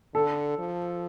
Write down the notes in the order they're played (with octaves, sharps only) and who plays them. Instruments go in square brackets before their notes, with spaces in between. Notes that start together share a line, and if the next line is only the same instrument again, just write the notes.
[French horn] D3 [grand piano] A4
[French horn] F3